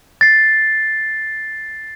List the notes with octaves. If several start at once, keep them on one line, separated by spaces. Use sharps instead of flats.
A6 C7